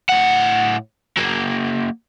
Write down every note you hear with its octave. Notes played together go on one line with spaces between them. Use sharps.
A2 F#5
F#3 A#3